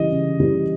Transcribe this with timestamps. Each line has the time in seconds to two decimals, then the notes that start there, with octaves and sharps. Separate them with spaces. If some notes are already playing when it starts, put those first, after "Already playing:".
Already playing: C#3 E3 G3 D#5
0.12 C#3
0.40 E3 G3